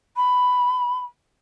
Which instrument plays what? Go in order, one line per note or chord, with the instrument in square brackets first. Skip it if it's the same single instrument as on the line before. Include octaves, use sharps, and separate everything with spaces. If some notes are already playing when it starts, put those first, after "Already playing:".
[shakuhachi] B5